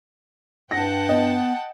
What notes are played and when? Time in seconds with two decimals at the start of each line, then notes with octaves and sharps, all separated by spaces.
0.71 G2 F#5 G5 A5 A#6
1.09 B3 D#5